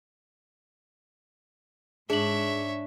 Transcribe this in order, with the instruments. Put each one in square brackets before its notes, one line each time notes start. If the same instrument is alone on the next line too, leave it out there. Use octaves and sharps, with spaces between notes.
[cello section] G#2 [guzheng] D4 [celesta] G#4 F#7 [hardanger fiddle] C#5 E5